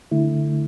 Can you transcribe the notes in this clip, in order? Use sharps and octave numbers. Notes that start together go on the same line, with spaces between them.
D3 A3 E4